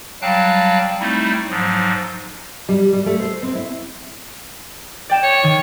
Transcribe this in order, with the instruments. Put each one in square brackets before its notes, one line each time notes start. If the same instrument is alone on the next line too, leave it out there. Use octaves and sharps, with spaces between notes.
[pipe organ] F#3 G3 F5 G5 A5 F#6
G3 A3 C4 D#4 E4
G#2 F3 F#3
[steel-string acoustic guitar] G3
G3
A3
C5
C4
E4
[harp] D5 G5 E7
[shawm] C#5
[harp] D#3